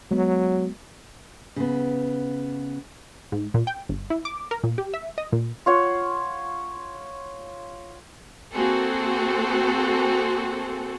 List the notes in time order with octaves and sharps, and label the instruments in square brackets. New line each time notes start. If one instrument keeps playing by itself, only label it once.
[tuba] F#3 [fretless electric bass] G#3 B3
[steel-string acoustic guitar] C#3 B3
[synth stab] G#2
A#2
G5
G1
E4
D6
A#4
A#2
G4
E5
D#5
A#2
[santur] F4 C#5 F#5
[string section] A#3 C4 F#4 G#4 A4